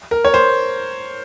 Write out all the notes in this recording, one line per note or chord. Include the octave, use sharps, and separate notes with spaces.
A#4
C#5
C5